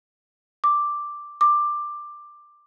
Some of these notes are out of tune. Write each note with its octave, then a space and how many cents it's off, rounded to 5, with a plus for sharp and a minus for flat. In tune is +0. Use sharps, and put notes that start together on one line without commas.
D6 +0
D6 +10